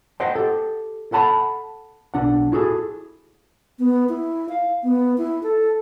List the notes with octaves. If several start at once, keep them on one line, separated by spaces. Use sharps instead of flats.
C5 D#5 F#5 G5
G4 A4
A4 F#5 A5 B5
B1 D4 F#5
E4 F#4 G#4 A4
B3
E4
F5
B3
E4
A4